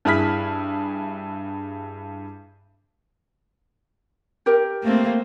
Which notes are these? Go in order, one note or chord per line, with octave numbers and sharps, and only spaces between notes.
G2 E4 G#4 B5 F6 B6
G4 A#4
A3 A#3 C4